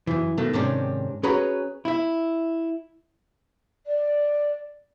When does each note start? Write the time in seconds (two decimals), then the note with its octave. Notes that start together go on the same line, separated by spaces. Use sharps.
0.07 F#2 E3
0.38 D2 B2 D#3 A3
0.53 G#2 C3 D#3 C#4 D4
1.23 C#4 F#4 G#4 B4 C#5 A#5
1.85 E4 E5
3.86 D5